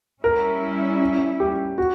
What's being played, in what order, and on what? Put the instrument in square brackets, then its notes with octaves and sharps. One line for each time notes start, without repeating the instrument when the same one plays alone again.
[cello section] G3 C#4 E4 [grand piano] A#4
[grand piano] G4
F#4